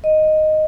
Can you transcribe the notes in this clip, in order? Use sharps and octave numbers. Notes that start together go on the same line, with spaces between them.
D#5